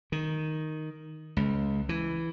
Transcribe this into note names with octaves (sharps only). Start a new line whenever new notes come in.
D#3
C#2
E3